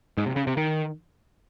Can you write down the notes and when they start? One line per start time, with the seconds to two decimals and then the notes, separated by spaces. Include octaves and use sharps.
0.17 G#2
0.26 C3
0.36 C#3
0.47 C3
0.57 D#3